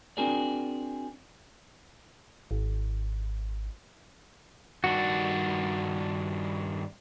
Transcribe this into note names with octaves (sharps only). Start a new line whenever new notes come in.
C4 D4 F#4 G#4 A#4 D5
G#1
G2 D#3 D4 F#4